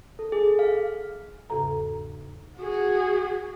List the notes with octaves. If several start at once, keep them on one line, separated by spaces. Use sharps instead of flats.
A4
G#4
F5
E2 G#2 C#3 A4 A#5
F#4 G#4